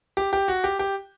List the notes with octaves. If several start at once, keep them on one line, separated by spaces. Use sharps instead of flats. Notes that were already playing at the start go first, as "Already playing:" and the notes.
G4
G4
F#4
G4
G4